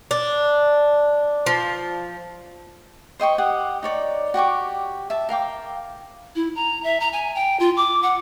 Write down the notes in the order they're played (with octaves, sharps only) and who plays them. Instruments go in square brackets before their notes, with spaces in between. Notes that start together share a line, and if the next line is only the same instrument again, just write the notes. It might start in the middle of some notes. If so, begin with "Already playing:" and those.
[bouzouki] D4
F3
[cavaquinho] C5 D#5 G5 C#6
G4 F#5 D#6
D#4 C#5 D5
F#4 G4 C#6 D6
E5 A5
A#4 F5 G5 D6
[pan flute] E4
A#5
E5
A#5
G#5
G5
F4
D6
F#5